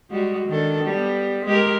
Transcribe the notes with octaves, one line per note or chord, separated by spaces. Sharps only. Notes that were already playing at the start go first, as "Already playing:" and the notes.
G3 G#3 F#4
D#3 D4 A4
G3 B3
G#3 G4 A#4